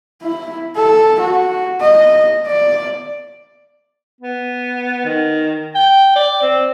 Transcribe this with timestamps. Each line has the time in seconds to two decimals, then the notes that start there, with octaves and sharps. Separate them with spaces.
0.22 E4
0.76 A4
1.20 F#4
1.81 D#5
2.46 D5
4.21 B3
5.05 D#3
5.75 G5
6.16 D5
6.42 C4